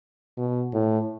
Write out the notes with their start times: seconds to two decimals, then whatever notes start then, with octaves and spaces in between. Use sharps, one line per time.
0.37 B2
0.74 A2